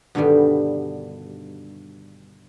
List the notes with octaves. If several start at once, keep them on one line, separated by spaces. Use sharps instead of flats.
G2 B2 D3 D#3 G3